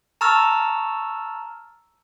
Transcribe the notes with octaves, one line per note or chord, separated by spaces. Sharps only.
A5 A#5 C#6 E6 F6 A6